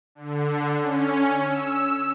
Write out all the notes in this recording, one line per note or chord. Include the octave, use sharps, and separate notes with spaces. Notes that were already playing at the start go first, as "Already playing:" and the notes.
D3
C#4
E6